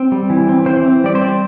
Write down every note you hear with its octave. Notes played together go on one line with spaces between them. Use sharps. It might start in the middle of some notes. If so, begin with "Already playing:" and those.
Already playing: C4
G3
E3
C4
E3 C5
C4
G3 D5
C5
C4